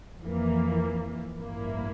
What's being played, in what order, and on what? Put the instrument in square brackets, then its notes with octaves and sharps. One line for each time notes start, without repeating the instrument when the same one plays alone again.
[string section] F2 E3 A#3
A1 G2 F3 A#3 E4